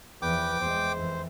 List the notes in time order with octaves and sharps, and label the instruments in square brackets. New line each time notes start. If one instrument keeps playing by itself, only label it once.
[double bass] E2 F3 [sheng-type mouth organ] B4 [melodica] G5 D6
[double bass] E2 G#3 [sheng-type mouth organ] C5
[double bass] F2 E3